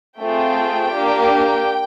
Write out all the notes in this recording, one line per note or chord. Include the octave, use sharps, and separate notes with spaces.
A3 C4 F4 G#4 G5
A#3 D4 G4